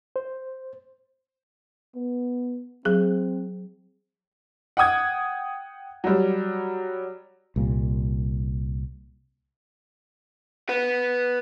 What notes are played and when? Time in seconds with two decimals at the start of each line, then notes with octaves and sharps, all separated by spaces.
0.16 C5
1.96 B3
2.85 F#3 C4 G#4
4.77 F#5 G5 D#6 G#6
6.04 F#3 G3
7.56 C2 A#2
10.69 B4 F#5